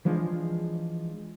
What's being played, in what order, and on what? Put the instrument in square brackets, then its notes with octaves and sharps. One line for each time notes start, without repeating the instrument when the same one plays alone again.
[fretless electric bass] E3 F3 G#3 D4